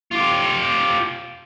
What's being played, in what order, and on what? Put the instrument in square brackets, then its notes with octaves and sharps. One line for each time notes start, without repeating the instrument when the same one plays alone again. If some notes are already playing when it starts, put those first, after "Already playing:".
[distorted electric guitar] F4 G4